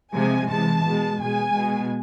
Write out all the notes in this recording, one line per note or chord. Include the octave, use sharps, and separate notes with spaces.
C3 F3 G#3 G#5
C3 E3 G#3 A5
B2 G#3
B2 G#3 G#5
B2 G#3